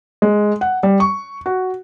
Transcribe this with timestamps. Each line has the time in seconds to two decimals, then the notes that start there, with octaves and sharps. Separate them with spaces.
0.22 G#3
0.61 F#5
0.83 G3
1.00 C#6
1.46 F#4